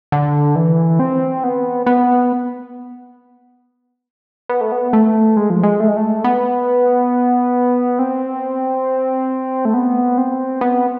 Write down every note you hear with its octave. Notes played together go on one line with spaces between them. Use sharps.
D3
E3
C4
B3
B3
B3
A3
B3
A3
G#3
F3
G#3
A3
G#3
A3
B3
C4
A3
B3
C4
B3